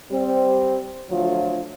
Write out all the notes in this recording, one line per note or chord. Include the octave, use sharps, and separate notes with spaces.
G3 C4
D3 F3 F#3 A3 F4